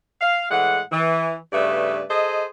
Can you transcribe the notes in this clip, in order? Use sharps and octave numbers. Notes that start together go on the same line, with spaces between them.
F5
A2 E3 G#3 F#5
E3
G2 C#3 A3 B4 D5 E5
G#4 A4 C5 D#5